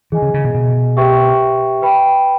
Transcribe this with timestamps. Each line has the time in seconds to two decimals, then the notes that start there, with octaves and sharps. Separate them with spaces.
0.12 E3 G#4 D#5 G#5
0.22 C#3
0.34 C#3
0.45 B2
0.55 B2
0.97 G4 B4 E5 G5 C#6
1.82 B4 G5 B5